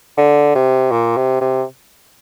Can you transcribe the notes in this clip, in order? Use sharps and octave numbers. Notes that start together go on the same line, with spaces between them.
D3
C3
A#2
C3
C3